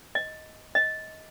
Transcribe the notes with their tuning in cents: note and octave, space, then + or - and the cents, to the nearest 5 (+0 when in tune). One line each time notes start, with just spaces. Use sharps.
D#5 +10
D#5 +20